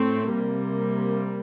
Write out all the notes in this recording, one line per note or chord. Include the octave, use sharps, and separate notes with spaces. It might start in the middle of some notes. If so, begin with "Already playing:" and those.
Already playing: A2 A3 C4
C3 G3 A#3